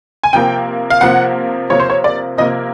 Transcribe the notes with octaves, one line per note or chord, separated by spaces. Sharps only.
G#5
C3 F3 A#3 G5
F5
C3 F3 A#3 F#5
C3 F3 A#3 C#5
C5
C#5
D5
C3 F3 A#3 D#5